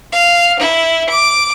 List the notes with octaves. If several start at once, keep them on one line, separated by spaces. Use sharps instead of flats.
F5
E4
D6